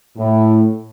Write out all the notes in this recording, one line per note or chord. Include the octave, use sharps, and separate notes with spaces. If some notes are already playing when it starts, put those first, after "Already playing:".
A2